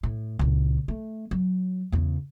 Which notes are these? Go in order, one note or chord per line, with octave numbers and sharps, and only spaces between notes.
A2
C#2 A#2
A3
F#3
E2 C#3